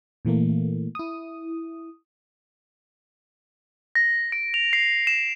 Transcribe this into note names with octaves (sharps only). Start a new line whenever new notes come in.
A#2 E3 A3 A#3
E4 D#6
A#6
D7
F7
C7
E7